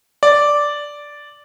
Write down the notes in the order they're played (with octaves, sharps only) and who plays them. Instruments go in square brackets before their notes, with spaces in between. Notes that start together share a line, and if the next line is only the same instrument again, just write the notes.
[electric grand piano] D5